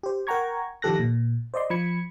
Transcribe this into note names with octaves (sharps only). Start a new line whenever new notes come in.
G4 C5
A#4 F#5 G5 A#5 C#6 G#6
D#3 F3 G4 A4 F#6 A#6
A#2
C5 D5 D#5 C6
F3 B5 G#6 C#7